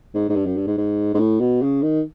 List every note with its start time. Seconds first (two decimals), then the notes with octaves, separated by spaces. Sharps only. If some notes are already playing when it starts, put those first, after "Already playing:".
0.14 G#2
0.29 G#2
0.36 G2
0.46 F#2
0.57 G2
0.67 G#2
0.78 G#2
1.14 G#2
1.19 A2
1.41 B2
1.62 C#3
1.83 D#3